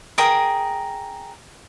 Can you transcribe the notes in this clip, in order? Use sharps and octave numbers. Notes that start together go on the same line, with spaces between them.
G#4 A#4 G5 D#6